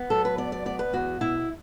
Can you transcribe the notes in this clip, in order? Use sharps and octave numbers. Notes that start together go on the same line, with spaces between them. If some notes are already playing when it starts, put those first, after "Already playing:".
Already playing: B3
F#3 A4
B4
B3 D5
D5
B3 D5
B4
E2 F#4
B2 E4